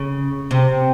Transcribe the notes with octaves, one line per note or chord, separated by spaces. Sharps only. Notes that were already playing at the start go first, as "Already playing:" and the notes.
Already playing: C#3
C3